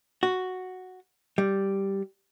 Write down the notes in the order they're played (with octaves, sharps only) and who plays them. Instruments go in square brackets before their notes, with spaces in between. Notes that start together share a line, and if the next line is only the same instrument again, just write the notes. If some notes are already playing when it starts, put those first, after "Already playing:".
[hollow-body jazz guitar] F#4
G3